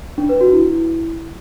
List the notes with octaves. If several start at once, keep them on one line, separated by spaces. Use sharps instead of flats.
D4
B4
F#4
E4